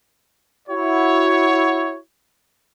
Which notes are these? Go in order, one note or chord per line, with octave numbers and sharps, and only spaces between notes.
E4 F#4 C#5